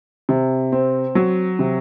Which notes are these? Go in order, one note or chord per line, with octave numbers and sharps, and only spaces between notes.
C3
C4
F#3
C3